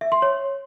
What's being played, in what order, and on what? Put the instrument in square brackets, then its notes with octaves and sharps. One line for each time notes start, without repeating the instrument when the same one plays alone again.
[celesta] E5
C6
C#5